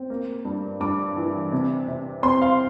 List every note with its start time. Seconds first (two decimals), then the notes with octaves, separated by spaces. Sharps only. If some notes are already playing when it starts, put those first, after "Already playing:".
Already playing: C4
0.10 A#3
0.45 G2
0.80 G2 D6
1.17 E3
1.52 C3
1.88 C3
2.23 C4 C6
2.42 F5